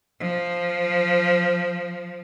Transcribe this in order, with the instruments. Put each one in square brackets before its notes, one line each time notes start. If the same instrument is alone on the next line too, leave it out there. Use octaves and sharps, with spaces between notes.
[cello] F3